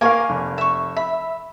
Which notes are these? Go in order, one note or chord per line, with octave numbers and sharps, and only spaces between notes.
A#3 A#4 F5 G#5 C#6
F1
E5 C#6
E5 B5